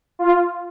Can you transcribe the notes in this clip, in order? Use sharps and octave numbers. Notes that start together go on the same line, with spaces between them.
F4